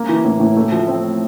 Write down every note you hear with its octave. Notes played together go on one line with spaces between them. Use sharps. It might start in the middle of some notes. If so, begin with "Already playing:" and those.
Already playing: A#3
E3
A2
A2
A3
F3
C4